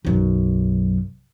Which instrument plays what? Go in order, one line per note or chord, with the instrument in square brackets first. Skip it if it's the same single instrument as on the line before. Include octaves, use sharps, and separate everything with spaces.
[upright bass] B1 F#2